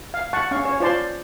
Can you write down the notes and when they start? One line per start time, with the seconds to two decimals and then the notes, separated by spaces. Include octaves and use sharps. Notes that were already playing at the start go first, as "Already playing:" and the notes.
0.14 F5
0.33 F#5 A5 C#6
0.51 C#4 F5 C#6
0.65 C#5
0.80 F4 C5 D5 A5 C6